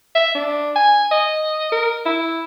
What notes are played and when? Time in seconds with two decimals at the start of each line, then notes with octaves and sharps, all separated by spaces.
0.15 E5
0.35 D4
0.76 G#5
1.11 D#5
1.72 A#4
2.06 E4